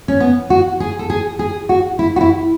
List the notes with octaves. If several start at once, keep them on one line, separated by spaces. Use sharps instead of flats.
C#4
B3
F#4
G#4
A4
G#4
G#4
F#4
E4
F#4
E4